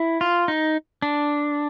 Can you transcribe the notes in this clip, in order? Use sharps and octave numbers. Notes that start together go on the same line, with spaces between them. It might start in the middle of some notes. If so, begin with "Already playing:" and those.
Already playing: E4
F4
D#4
D4